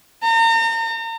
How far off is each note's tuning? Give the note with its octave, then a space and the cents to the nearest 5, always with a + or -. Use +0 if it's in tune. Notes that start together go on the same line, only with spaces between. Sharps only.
A#5 -40